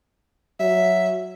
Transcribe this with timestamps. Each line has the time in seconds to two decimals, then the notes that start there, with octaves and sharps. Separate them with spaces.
0.60 F#3 E5